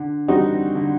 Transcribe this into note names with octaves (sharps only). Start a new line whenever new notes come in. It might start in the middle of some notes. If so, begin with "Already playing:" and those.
Already playing: D3
G3 C4 D#4 F#4
D3